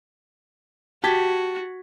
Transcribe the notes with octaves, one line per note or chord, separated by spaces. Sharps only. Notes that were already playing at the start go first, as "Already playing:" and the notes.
F#4 G4 A5 G#6 B6